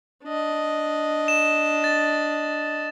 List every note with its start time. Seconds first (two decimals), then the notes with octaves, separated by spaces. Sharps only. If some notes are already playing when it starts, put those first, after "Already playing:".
0.23 D4 D#5
1.28 E7
1.84 A6